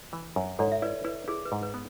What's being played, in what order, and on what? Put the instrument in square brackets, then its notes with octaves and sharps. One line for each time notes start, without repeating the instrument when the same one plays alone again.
[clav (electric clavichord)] E3
F#2
[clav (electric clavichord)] G#2 [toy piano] A4 C#5
[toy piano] E5
[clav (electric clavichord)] E4 [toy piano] B4 D5
[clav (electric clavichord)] E4 [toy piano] B4
[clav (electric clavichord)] E4 [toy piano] G#4
[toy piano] B4
[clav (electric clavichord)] G#2
[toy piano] B4
[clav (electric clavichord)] B3